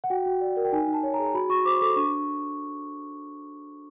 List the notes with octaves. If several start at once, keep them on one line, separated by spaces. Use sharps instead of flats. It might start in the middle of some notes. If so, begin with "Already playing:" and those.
F#5
F#4 G5
F#4
D5
A#4
G5
D#4 G#5
D#4
A5
C#5
A#5
G#4
F#4 B5
F#4 C#6
C5 D6
A4 D6
D4 C#6